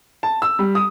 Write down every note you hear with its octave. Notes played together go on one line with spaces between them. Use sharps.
A5
E6
G3
D#6